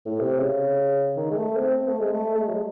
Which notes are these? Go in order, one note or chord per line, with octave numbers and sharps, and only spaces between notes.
A2
C3
C#3
D#3
G#3
A3
C4
C4
A3
G#3
A3
A3
G#3
F#3
G#3